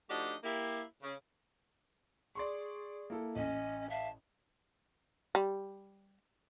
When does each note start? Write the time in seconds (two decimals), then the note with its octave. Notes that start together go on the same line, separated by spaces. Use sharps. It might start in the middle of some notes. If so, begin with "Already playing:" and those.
0.09 F3 A3 D4 D#4 F#4 G4
0.44 A#3 E4 G4
1.02 C#3
2.35 G#4 D5 C6 C#6
3.10 A#3 E4 A4
3.36 A1 C#4 D#5
3.90 E5 F5 A5
5.35 G3